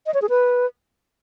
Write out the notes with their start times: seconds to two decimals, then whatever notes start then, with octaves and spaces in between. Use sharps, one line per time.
0.06 D#5
0.14 C#5
0.22 G#4
0.30 B4